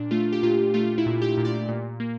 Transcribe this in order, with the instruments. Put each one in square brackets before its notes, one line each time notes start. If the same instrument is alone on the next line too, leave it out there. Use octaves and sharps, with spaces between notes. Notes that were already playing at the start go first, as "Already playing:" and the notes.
Already playing: [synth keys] A#2 D4
A3 F4
G4
A#2 F4
A3 F4
E4
A#2
G4
A#2
D5
A#2
A#3